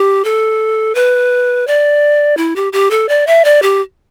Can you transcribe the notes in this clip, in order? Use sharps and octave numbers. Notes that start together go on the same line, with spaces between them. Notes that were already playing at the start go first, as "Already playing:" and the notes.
Already playing: G4
A4
B4
D5
E4
G4
G4
A4
D5
E5
D5
G4